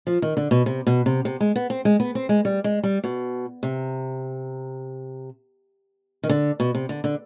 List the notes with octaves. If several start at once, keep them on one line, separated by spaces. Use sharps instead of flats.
F3
D#3
D3
B2
C3
B2
C3
C3
G#3
B3
C4
G#3
B3
C4
G#3
G3
G#3
G3
B2
C3
D#3
D3
B2
C3
D3
D3